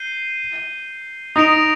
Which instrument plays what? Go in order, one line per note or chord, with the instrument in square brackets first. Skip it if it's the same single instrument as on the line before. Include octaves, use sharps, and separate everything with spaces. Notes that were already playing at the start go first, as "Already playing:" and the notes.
Already playing: [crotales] G6 C7 D#7 G7
[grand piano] D#4 [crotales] D#6 A#6 D7 F7